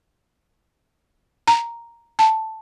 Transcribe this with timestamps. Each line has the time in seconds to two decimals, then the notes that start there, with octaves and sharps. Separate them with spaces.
1.48 A#5
2.19 A5